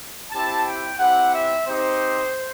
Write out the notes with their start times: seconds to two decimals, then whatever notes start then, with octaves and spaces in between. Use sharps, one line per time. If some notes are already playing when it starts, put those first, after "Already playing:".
0.32 C4 E4 G4 A5
0.66 G5
0.99 C4 E4 G4 F#5
1.33 E5
1.66 C4 D#4 G4 C5